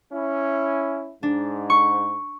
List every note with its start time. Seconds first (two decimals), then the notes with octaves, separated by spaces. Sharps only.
0.13 C#4 E4
1.23 G#2 D4
1.70 C#6